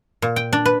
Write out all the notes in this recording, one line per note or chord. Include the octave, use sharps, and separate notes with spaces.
A#2
G5
D4
B4